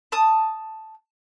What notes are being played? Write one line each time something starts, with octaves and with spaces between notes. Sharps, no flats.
A5 D#6